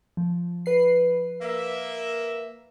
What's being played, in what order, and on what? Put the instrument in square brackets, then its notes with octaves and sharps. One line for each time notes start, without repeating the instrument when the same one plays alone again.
[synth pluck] F3
B4 C7
[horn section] A#3 E5